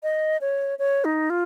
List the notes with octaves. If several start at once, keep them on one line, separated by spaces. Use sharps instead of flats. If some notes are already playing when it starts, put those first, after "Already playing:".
D#5
C#5
C#5
D#4
F4